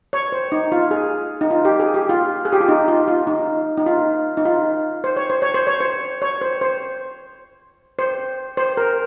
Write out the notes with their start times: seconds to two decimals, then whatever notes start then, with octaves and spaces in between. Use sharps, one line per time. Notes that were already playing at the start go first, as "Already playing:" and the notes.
0.13 C#5
0.32 C5
0.52 D#4
0.72 F4
0.91 G#4
1.41 D#4
1.51 F4
1.65 G4
1.80 G#4
1.94 G4
2.09 F4
2.45 G#4
2.53 G4
2.60 F4
2.69 D#4
2.88 F4
3.08 F4
3.27 D#4
3.78 D#4
3.86 F4
4.37 D#4
4.45 F4
5.04 C5
5.16 C#5
5.30 C5
5.42 C#5
5.54 C5
5.67 C#5
5.80 C5
6.22 C#5
6.41 C5
6.61 C5
7.99 C5
8.57 C5
8.77 A#4